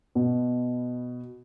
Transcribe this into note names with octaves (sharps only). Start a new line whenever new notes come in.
B2